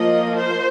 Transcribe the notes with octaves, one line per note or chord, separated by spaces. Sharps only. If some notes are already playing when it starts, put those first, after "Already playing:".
Already playing: F3 A#3 D#5
C5